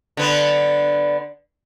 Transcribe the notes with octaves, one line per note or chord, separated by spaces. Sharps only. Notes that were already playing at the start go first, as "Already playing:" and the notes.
D3 B3